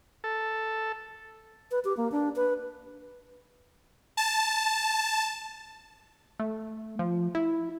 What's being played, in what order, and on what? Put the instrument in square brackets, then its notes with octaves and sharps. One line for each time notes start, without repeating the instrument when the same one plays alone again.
[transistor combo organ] A4
[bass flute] B4
G4
A#3
D4
B4
[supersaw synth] A5
[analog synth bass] A3
F3
E4